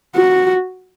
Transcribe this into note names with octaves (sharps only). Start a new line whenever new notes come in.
F#4